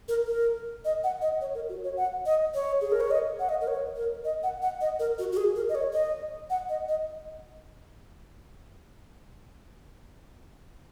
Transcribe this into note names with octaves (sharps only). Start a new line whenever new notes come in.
A#4
A#4
D#5
F#5
D#5
C#5
A#4
F#4
C#5
F#5
D#5
C#5
G#4
A#4
C#5
D#5
F#5
D#5
A#4
C#5
A#4
D#5
F#5
F#5
D#5
A#4
F#4
F#4
G#4
A#4
D#5
C#5
D#5
F#5
D#5
D#5